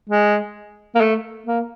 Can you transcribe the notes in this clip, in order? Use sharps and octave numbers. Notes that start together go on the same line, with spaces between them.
G#3
A#3
A3
A#3